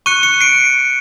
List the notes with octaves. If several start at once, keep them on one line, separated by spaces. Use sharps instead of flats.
C#6 F#6 C#7 D#7
C#7 D#7
C7 D7